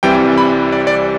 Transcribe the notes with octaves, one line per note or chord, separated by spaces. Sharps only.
C2 C3 E3 G3 G5
B5
D5
D5